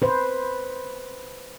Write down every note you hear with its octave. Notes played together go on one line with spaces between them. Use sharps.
B4 C5